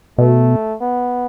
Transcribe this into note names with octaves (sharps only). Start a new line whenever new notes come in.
B2 A3
B3